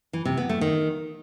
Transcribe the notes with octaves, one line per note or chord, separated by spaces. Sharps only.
E3
C3
B3
A3
D#3